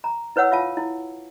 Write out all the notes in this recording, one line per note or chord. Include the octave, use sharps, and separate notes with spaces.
A#5
E4 B4 C#5 F#5 E6
F4 F5 A5
E4